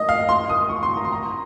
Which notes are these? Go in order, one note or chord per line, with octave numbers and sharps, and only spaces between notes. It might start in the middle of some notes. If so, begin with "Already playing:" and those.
Already playing: D#5
F5
C6
D#6
C#6
C6
A#5
C6
A#5